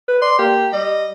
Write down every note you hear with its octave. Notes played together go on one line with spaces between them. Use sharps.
B4
D5 C6
A#3 G4
G3 D#5